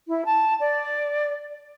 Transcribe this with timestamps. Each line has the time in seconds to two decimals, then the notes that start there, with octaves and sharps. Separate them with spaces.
0.08 E4
0.25 A5
0.60 D5